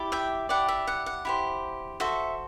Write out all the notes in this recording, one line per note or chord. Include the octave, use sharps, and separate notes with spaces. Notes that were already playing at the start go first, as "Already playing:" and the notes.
Already playing: E4 G4 D5
E5 G5
E4 G4 D5 F#5
E5
F#5
F#5
E4 G4 C5
F#4 A4 C5 E5